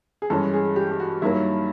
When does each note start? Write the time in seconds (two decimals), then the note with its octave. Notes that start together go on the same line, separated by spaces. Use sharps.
0.22 G#4
0.30 G2 E3 G#3 C#4 A4
0.53 G#4
0.76 G4
0.91 G4
1.00 F#4
1.22 G2 D#3 F#3 A#3 E4